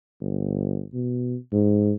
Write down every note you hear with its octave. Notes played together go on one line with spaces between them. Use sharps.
G1
B2
G#2